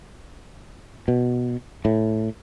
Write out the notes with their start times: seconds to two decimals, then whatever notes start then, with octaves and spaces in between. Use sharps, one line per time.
1.08 B2
1.85 A2